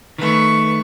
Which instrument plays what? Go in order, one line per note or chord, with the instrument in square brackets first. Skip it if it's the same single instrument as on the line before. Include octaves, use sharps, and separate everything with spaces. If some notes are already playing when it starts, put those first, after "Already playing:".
[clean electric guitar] D#3 A3 [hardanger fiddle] B4 C#6